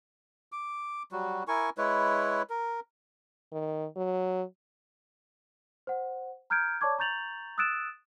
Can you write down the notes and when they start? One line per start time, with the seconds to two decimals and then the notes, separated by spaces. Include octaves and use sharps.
0.52 D6
1.12 F#3 G3 F#4
1.48 E4 A#4 G#5 C#6
1.78 G#3 E4 B4 C#5
2.50 A#4
3.53 D#3
3.96 F#3
5.87 C5 F#5
6.50 A#5 F6 G6 G#6 D7
6.81 C#5 D5 A5 C#6 D6 G#6
6.98 A#5 C#6 G6 A6 F7 F#7
7.58 D#6 E6 F#6 A6 D7 E7